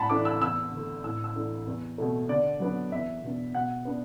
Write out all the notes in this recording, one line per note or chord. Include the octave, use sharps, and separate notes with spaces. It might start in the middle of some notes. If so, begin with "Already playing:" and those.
Already playing: A2 F#5 A5 B5
E3 A3 D4 D6
E6
E2 E6
D3
A3
A2 E6
E6
E3 A3 D4
E2
B2 A3
D3 D5
F#3 B3 D4
E2 E5
B2 B3 D4
B2 F#5
B3 D4